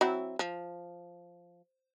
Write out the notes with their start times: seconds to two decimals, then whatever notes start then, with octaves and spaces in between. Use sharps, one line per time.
0.01 F#3 C4 E4
0.39 F3